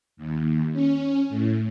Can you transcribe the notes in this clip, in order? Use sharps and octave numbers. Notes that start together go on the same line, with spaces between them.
D#2
C#4
A2